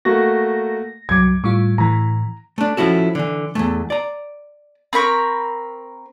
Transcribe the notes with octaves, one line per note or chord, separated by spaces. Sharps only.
A3 A#3 F#4 A#6
C2 G2 F#3 D6 G#6
A2 G3 F4 C#6
A2 E3 A#5
A3 D4
F3 C#4 E4 F#4 A4
D3 E3
E2 C#3 A3
D5 A#5
C4 A#4 B5 C#6